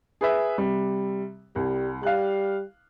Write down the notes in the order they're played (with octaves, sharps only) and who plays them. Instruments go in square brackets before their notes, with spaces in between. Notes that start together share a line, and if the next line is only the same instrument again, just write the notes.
[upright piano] G#4 B4 E5
C3 G3
[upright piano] C2 [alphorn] G3
[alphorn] G3 [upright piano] F5 F#6